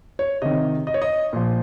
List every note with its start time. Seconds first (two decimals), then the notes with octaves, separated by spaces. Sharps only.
0.19 C#5
0.42 C3 D#3 D#5
0.87 D#5
0.94 C#5
1.02 D#5
1.33 A#2 F3